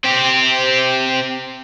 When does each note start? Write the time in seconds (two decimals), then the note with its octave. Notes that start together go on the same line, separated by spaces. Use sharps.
0.04 C4 G4